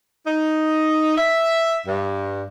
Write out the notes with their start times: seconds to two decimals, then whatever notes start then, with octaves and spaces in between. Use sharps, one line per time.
0.27 D#4
1.17 E5
1.86 G2